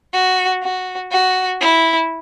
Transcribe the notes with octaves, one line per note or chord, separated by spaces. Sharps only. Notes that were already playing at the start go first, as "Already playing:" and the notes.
F#4
F#4
F#4
E4